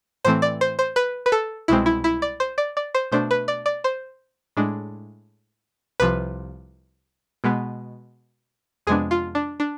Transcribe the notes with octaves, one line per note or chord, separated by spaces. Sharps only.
A2 E3 A3 C4 C5
D5
C5
C5
B4
B4
A4
C2 B2 G#3 C4 E4
E4
E4
D5
C5
D5
D5
C5
B2 A3 D4 C5
B4
D5
D5
C5
A2 G#3 D4
C2 C3 F3 B4
B2 G#3 B3
F2 C3 G#3 B3 D4 G#4
F4
D4
D4